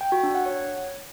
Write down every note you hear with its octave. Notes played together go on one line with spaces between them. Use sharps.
G5
F#4
D4
F#5
C#5